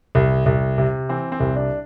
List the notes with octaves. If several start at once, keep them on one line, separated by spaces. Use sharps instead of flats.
C2
C2
C3
E3 C4
C4
C2
D4